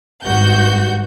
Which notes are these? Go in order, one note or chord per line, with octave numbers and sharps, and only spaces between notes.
G#1 G2 F#4 G6